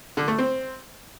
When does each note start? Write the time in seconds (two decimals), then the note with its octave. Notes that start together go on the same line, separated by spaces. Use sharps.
0.17 D3
0.28 A3
0.39 C4